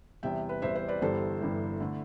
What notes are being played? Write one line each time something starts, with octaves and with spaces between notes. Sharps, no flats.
E2 C3 G3 E5 G5
B4
E2 C3 G3 C5 E5
C5 E5
B4 D5
G1 G2 E3 G3 A4 C5
G1 G2 E3 G3
D3 A3 E4